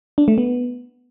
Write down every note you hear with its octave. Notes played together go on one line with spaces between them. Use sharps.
D4
A3
B3